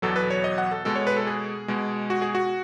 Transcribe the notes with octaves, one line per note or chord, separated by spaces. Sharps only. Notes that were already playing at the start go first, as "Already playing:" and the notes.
E2 B2 F#3 A4
B4
C#5
D#5
F#5
A4
B2 G#3 A4
C#5
B4
A4
G#4
B2 G#3
F#4
G#4
F#4